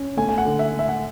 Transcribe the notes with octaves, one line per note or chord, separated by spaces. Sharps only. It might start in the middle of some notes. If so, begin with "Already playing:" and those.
Already playing: C#4
A3 G#5
G#5
F#5
D3
E5
A3
E5
F#5